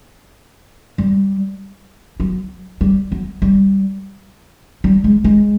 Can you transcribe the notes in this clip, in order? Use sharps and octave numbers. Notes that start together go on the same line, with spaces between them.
G3
F#3
G3
F#3
G3
G3
G#3
G#3